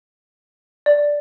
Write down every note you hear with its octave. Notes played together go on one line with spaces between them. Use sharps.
D5